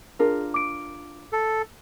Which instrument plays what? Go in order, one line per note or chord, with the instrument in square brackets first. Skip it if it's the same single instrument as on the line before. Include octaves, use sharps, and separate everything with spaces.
[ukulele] D4 F4 A#4 [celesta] G#4
[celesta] D6 D7
[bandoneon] A4